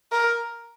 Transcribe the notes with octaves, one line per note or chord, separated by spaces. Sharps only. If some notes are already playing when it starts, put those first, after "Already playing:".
A#4